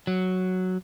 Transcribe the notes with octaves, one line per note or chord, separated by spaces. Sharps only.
F#3